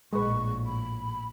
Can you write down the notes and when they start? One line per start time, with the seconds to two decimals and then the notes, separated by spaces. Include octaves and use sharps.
0.13 A#1 A2 G#3 B4 C#6
0.66 B5